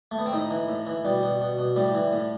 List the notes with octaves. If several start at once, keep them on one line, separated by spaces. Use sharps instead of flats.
A3
B3
C4
A2 D#4
E3
A2
E3
B2 G3
B2
B2
B2
A2 G3
E3
A2